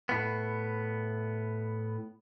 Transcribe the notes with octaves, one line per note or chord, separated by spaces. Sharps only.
A2 B3